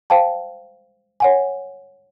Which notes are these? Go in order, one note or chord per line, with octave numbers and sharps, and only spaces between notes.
C5 F5 G5 A5
C#5 F#5 G#5